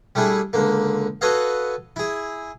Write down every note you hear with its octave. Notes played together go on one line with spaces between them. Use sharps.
G3 A3 D4 E4 G#4
C#2 D3 A#3
F#4 A4 B4 C#5 D#5 F5
E4 G#4